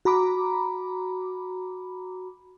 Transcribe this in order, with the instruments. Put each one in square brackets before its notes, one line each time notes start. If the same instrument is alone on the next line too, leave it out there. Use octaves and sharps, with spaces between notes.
[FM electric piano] F#4 A#5 B5 D6